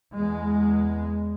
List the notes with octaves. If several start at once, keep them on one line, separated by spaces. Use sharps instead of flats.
E2 G#3